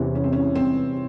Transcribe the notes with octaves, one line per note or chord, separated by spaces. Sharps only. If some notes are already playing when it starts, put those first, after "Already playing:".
Already playing: E2 C3 E3 C#4
C#4
C4
C#4
C4